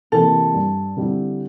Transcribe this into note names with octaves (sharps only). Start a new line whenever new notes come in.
C3 E3 A#3 E4 A4
G2
D3 G3 C4 E4